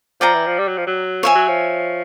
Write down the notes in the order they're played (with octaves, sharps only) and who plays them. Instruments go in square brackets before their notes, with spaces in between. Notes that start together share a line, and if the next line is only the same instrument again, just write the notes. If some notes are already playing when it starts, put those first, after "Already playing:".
[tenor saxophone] F3 [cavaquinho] D5 G5 A#5
[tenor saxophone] E3
F3
G3
F#3
F3
F#3
[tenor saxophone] F3 [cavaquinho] C#5 E5 G#5
[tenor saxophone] F#3
F3